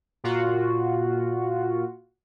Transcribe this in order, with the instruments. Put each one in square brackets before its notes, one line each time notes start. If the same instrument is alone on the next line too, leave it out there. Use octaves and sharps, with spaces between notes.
[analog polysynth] A#2 F4 F#4